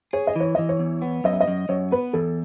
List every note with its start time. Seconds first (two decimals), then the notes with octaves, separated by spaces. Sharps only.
0.13 G#4 C#5
0.27 D#5
0.36 E3 C#5
0.55 E3 D#5
0.69 C#5
0.79 E2
1.02 B3
1.24 F#2 D#5
1.33 E5
1.41 D#5
1.48 F#2
1.69 F#2 C#5
1.92 B3 B4
2.13 E2 A4